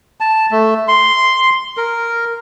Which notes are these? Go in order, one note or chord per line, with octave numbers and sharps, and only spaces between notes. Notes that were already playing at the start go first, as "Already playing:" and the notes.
A5
A3
C6
A#4